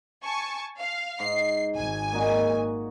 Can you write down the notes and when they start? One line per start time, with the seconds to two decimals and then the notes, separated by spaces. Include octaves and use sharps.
0.23 G#5 A5 C#6
0.78 F5
1.20 G#2 C7
1.76 G#1 G#5
2.13 A#2 D#4 F#4